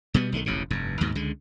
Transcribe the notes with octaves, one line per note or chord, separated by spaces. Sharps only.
B2 G3 B3
B1 D#3 F3 A3
E1 A1 F2 C#3
F1 G2
D#2 G#2 B2
C#2 D3 G#3